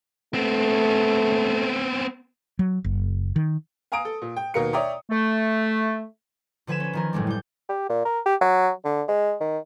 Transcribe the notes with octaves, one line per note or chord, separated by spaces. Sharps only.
A3 B3 C4
F#3
F#1
D#3
F5 G#5 A#5 D#6 D7
A4
A#2
G5
D#2 B2 A#3 A#4 F5 C#7
C#5 D5 E5 G5 A#5 D#6
A3
D3 F3 B4 G#5 B6 E7
C#4 B4
D#3 F3 A#4
F#1 A2 G#3 D4
G3 G6
G4
A#2
A#4
G4
F#3
D3
G#3
D#3